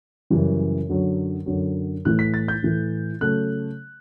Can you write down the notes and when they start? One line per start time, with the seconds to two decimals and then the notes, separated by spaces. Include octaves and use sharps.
0.30 F#2 C#3 E3 G3
0.89 F#2 D3 F#3
1.46 F#2 D3 F#3
2.05 A2 E3 A3 F#6
2.19 B6
2.34 A6
2.48 G6
2.63 A2 E3 A3
3.21 C#3 F#3 A3 F#6